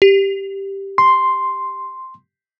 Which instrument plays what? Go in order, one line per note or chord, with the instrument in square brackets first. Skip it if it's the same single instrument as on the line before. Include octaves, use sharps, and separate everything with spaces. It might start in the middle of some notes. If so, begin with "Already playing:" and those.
[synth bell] G4
[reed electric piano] C6